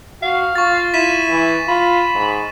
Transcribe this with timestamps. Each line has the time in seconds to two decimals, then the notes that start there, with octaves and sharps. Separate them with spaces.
0.23 F#4 F5
0.55 F4 C#6 A6
0.94 E4 B6 D#7 E7
1.30 E3
1.68 F4 B5
2.15 G#2